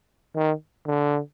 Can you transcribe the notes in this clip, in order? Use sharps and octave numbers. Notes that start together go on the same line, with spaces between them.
D#3
D3